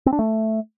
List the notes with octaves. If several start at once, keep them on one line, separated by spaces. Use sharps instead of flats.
C4
D4
A3